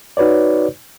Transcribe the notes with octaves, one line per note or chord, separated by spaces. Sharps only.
D#4 F#4 B4 C#5 D5